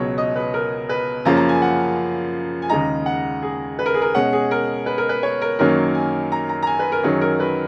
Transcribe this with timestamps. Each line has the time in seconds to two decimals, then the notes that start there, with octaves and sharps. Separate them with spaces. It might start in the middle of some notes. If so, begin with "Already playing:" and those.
Already playing: C#2 B2 F#3 C#5
0.18 D#5
0.36 B4
0.54 A#4
0.89 B4
1.25 F#2 C#3 F3 A#3 C#4 A#5
1.37 A#5
1.49 G#5
1.62 F#5
2.62 G#5
2.70 D#2 C#3 G#3 D#4 A#5
3.06 F#5
3.42 G#4
3.79 B4
3.86 A#4
3.94 G#4
4.02 A#4
4.15 B2 G#3 C#4 F#5
4.33 G#4
4.51 A#4
4.86 B4
4.98 A#4
5.09 B4
5.23 C#5
5.42 A#4
5.59 F#2 D#3 F#3 A#3 C#4 A#4
5.95 G#5
6.32 A#5
6.49 A#5
6.63 A#5
6.67 G#5
6.79 B4
6.92 A#4
7.03 F#2 D#3 F#3 C#4 G#4
7.21 A#4
7.40 B4